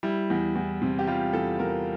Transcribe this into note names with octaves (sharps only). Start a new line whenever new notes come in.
G3 E4
E2
E2
C3
G4
G3 F4
E2 A4
E2 A#4